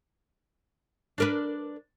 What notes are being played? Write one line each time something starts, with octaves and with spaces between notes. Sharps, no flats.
D4 A#4 B4